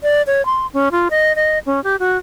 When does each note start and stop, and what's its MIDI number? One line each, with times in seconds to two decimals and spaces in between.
0.03 0.22 74
0.27 0.45 73
0.46 0.67 84
0.73 0.89 61
0.91 1.08 65
1.10 1.35 75
1.36 1.59 75
1.66 1.83 61
1.84 1.96 67
1.99 2.18 66